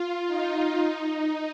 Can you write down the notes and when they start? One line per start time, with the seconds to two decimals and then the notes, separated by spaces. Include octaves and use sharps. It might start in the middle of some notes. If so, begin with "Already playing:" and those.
Already playing: F4
0.27 D#4
0.77 D#4